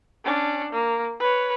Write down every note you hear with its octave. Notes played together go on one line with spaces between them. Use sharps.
C#4 D4
A#3
B4 C#5